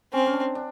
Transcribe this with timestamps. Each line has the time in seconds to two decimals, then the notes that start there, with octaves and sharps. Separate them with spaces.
0.13 C4 C#4
0.26 C#4
0.33 D4
0.55 D4